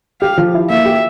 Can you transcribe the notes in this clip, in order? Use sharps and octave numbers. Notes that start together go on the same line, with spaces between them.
G4 F5
F3
E4
A#3 E5
G4